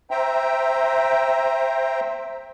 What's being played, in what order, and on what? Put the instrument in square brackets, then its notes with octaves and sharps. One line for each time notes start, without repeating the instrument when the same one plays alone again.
[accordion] C5 E5 G5 A#5